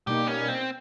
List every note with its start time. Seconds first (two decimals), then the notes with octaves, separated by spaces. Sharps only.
0.07 B2 G3 A#3 D#4 G4
0.27 C#4
0.48 C4